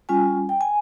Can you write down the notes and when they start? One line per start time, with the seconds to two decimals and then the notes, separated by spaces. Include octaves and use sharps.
0.09 G3 C#4 F4 G#5
0.49 G5
0.61 G#5